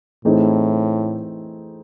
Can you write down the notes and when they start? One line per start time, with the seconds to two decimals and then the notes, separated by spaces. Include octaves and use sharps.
0.25 A2 E3 A3 C4 D#4 G#4